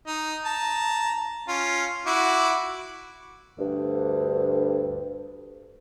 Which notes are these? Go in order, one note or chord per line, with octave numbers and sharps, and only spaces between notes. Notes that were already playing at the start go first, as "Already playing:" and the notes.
D#4
A5 A#5
C#4 F4
E4 F#4 D6
D2 G2